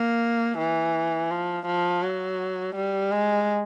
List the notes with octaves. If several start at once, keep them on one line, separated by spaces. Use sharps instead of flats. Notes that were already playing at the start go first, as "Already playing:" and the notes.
Already playing: A#3
E3
F3
F3
F#3
G3
G#3